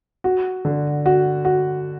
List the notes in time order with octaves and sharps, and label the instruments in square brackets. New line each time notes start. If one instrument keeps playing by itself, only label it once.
[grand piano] F#4
D3
F#4
F#4